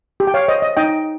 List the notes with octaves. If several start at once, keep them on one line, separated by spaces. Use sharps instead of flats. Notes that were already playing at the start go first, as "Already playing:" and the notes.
G4
G5
C#5 F5
C5 D#5
D#5
D#4 D#5 G5